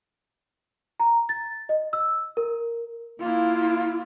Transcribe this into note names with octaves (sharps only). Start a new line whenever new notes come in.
A#5
A6
D#5
E6
A#4
A#3 E4 F4